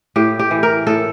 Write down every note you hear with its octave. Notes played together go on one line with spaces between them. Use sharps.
A2 G4
G4
E3
A#4
A2 A4